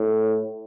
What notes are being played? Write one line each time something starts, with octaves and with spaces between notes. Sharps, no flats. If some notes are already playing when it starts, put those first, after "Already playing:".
Already playing: A2